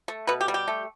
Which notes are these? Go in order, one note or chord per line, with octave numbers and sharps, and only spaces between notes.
A3
B2 B4
G4
G3
G4
A3